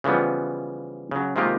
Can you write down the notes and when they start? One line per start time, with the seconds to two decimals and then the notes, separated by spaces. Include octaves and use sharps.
0.04 C#3 E3 F3 G3 B3
1.11 C#3 F#3
1.36 C3 D#3 G#3 A#3 F4 G4